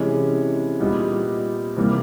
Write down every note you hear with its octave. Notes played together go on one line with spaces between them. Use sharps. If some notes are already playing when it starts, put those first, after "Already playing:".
Already playing: C3 E3 G#3 C#4
A#2 G3 B3 D#4
C3 E3 G3 A#3